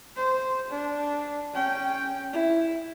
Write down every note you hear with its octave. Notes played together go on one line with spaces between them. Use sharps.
C5
D4
C#4 G5
E4